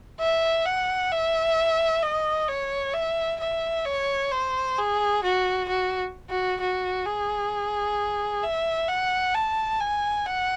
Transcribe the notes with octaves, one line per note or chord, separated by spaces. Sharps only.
E5
F#5
E5
D#5
C#5
E5
E5
C#5
C5
G#4
F#4
F#4
F#4
F#4
G#4
E5
F#5
A5
G#5
F#5